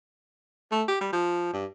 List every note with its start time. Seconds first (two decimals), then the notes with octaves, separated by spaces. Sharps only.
0.72 A3
0.88 G4
1.01 G3
1.13 F3
1.53 G2